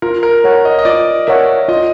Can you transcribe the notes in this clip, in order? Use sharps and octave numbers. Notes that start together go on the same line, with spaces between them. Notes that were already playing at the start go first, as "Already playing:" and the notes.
F4 A#4
A#4
A#4 C#5 F#5
D#5
D#5
F4 D5
A#4 C#5 E5 F#5
F4 D#5